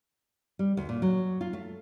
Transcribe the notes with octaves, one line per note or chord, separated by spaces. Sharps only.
G3
D2
A#2
F#3
F4
A3